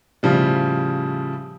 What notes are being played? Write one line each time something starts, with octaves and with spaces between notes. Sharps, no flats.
A2 C#3 F3 G3